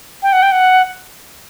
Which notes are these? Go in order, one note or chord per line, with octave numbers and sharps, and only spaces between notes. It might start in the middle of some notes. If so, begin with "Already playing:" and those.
G5
F#5
G5
F#5